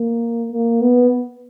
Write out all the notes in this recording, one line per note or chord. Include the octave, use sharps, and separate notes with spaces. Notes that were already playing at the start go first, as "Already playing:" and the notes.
Already playing: A#3
A#3
B3